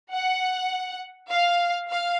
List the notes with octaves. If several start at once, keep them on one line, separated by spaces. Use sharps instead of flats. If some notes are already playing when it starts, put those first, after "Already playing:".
F#5
F5
F5